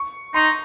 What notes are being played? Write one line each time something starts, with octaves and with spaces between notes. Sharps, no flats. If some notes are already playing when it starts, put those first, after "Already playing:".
Already playing: C#6
D#4 C6